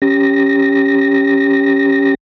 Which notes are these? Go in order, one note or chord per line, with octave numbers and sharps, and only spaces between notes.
C#4 G4 A#6